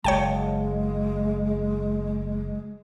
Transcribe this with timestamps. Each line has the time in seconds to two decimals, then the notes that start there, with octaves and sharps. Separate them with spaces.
0.04 F#1 G#3 C#5 G5 A5